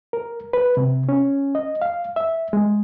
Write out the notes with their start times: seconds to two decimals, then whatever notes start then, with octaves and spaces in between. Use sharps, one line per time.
0.13 A#4
0.53 B4
0.77 C3
1.09 C#4
1.55 D#5
1.82 F5
2.16 E5
2.53 G#3